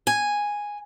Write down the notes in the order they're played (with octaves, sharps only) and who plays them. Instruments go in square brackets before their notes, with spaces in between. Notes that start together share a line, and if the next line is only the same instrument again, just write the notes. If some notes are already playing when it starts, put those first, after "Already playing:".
[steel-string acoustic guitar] G#5